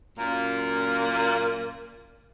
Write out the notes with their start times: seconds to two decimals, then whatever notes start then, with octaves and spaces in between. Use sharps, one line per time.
0.19 F#2 A#2 A#3